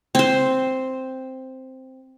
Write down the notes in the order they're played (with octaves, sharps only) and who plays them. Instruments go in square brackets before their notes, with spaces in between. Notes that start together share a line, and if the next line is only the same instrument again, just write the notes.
[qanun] C4 C5